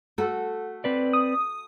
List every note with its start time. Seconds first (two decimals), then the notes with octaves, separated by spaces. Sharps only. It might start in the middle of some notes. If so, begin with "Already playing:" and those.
0.18 A3 F#4 A4
0.84 C4 B4 D5
1.13 D#6